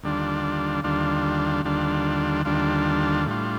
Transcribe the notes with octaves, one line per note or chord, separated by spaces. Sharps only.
D#2 D3 G3 D4 F4
D#2 D3 G3 D4 F4
D#2 D3 G3 D4 F4
D#2 D3 G3 D4 F4
A2 G3 D4 F4